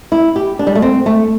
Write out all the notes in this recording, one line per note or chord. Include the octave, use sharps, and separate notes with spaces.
E4
G4
D4
G3
A3
C4
A3